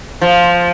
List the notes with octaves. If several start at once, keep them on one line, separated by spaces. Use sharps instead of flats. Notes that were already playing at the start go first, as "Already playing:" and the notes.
F3